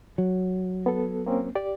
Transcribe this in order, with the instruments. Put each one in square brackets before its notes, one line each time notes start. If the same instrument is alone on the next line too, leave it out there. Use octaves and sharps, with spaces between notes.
[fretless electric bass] F#3
[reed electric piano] B3 A4
A#3 C4 C#4
G4 D5